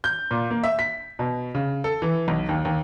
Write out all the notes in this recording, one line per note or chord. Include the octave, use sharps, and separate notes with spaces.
G6
A#2
A#3
E5
B6
B2
C#3
A4
E3
B1
D#2
D#2